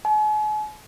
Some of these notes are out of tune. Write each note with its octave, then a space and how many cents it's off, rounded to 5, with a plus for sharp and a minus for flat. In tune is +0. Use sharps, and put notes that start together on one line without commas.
G#5 +45